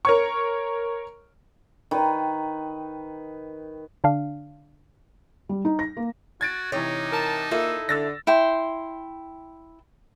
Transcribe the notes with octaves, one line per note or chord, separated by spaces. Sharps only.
A#4 C#5 C#6
D#3 B4
D3 D4 F5
G3
D#4
A#6
A#3
F#4 G#6 A6 D7
C3 E3 D#4 C#5
A#4 A5
A#2 A#3 E4 F4 A4 E5
D3 E6 A6 A#6
E4 G5 C6